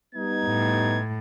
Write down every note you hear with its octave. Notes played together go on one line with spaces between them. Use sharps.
G3 B3 D#4 G#6
A2